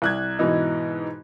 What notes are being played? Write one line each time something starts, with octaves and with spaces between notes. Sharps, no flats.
C2 F#6 G#6
G#2 B2 E3 D#4